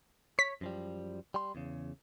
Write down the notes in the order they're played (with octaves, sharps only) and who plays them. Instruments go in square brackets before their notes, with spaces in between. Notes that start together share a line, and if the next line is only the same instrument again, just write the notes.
[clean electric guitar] C#5 [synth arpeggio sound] B6
[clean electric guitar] F#2 F3 G3
G3 C6
E2 C#3